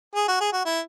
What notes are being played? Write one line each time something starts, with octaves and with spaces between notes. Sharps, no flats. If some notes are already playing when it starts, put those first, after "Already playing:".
G#4
F#4
G#4
F#4
E4